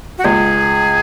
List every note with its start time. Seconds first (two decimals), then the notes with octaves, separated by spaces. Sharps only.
0.18 F#4
0.24 C#2 G#4